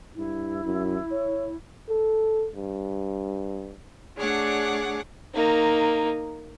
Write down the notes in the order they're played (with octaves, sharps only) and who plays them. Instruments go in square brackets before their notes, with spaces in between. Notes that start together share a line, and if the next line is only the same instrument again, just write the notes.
[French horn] G2 [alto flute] E4
[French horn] F#2
C#5
[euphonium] A4
G2
[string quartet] A3 D4 G#4 C#5 D5 F#5
[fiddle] A#3 D#4